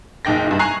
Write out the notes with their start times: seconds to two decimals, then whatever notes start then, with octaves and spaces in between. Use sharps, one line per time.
0.25 F#1 B1 D#4 G5 A#6
0.46 C2 G2
0.59 G#5 A#5 C#6 F#6 C7